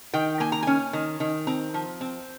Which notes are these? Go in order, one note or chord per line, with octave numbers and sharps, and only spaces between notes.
D#3 G5
A#3 G#5
A#5
C#4 G#5
D#3
D#3
C4 A#5
F3
C4